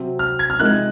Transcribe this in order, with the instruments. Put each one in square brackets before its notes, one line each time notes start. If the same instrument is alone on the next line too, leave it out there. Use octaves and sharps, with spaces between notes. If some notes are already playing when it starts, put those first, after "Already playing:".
Already playing: [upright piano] C3 F#3 C4
[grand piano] F6
G#6
F6
[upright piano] C3 F3 G#3 D#4 A#4 [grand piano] F#6